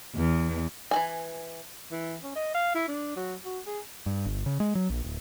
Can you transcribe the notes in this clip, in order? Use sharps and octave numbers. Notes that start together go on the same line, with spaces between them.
E2
E3 F#4 G#5
E3
C#4
D#5
F5
E4
D4
F#3
F#4
G#4
G2
G1
C#3
G#3
F#3
A#1
D1